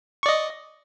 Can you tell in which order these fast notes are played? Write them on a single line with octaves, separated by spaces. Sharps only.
C#6 D5 D#5